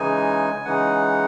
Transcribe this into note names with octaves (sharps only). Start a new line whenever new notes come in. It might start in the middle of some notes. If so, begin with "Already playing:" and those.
Already playing: C#3 E3 G#3 D#4 G#5
C#3 E3 G#3 D#4 F#5